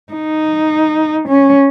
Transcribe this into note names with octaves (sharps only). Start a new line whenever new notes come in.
D#4
C#4